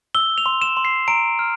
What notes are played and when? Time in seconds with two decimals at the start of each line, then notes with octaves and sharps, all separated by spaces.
0.15 E6 G7
0.38 F7
0.46 C6
0.62 E7
0.77 C6
0.85 C7
1.08 A#5 D7
1.39 F6